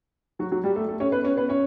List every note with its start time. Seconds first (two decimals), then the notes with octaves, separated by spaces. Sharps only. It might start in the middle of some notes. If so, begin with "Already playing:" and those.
0.39 F#3 F#4
0.52 F#3 F#4
0.64 G3 G4
0.76 A3 A4
0.88 A3 A4
1.00 C#4 C#5
1.12 B3 B4
1.24 C#4 C#5
1.37 B3 B4
1.49 C#4 C#5